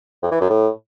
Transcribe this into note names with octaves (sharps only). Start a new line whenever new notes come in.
F2
E3
F#2
A2